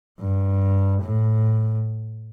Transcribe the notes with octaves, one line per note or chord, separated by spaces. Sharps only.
G2
A2